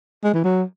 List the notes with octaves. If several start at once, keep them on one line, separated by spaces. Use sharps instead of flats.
G#3
E3
F#3